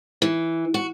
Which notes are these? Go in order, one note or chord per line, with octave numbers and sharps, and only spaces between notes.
E3
F#4